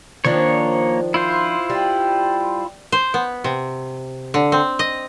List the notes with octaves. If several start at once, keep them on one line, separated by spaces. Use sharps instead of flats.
D#3 F3 A#3 D4 C#5
E4 F4 C5
G3
C5
B3
C3
D3
C4
D#5